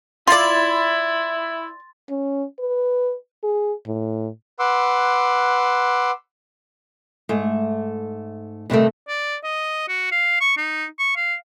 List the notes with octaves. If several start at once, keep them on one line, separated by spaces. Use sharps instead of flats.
E4 F4 D5 C6 A6
C#4
B4
G#4
A2
B4 F#5 C6 D6 E6
G#2 A3
G2 C3 D#3 A3
D5
D#5
F#4
F5
C#6
D#4
C#6
F5